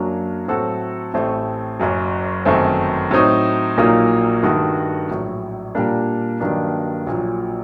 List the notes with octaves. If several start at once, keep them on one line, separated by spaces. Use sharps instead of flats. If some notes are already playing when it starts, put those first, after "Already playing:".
Already playing: F#2 F#3 A#3 D4
A2 F#3 C4 F#4 A4
A1 A2 A3 C4
F#1 F#2 F#3
G1 F#2 D#3 A3 C4
A2 F#3 C4 D#4
A#1 A#2 F#3 A#3 D#4
G2 D#3 A3 D#4 F#4
A#1 A2 F#3
A#2 G3 A#3 D4
G2 D#3 F#3 A#3 D4
A#1 A#2 F#3